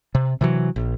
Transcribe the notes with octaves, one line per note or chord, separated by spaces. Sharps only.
C3
C3 E3 F#3
A#1